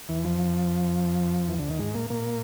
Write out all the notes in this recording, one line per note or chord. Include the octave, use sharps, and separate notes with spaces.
E2 E3
F2 F3
E2 E3
D2 D3
D#2 D#3
G#2 G#3
A#2 A#3
A#2 A#3